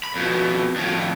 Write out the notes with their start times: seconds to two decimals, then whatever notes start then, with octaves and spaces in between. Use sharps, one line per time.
0.04 B5
0.16 F2 B2
0.76 F2 A2